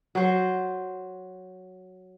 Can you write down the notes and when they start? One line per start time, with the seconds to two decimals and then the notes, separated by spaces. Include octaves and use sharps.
0.15 F#3 C5